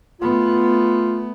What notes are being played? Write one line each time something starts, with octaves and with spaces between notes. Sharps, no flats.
A3 B3 F4